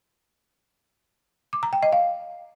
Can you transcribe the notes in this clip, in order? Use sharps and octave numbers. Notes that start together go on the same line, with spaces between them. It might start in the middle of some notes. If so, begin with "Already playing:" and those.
D6
A#5
G5
D#5
F5